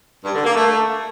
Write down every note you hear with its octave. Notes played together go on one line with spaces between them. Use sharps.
G2
D3
A#3
A3